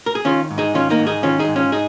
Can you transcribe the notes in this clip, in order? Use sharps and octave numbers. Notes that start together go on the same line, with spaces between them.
A#4
G#4
D#3 C#4 F4
G#2
D#4 G#4
D#3 C#4 F4
A#3 D#4
G#2
D#4 G#4
D#3 C#4 F4
D#4 G#4
G#2
C#4 F4
D#4 G#4